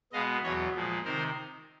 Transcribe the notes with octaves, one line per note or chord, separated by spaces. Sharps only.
B2 G#3 B3 D#5 F5
E2 B2 F#3 C#5 D#5
A#2 F3 G#3
C3 D#3 A#4 C5